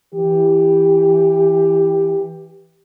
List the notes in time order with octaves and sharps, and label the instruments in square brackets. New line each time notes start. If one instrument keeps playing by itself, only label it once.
[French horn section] E3 G4